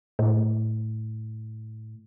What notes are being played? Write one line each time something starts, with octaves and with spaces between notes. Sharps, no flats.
A2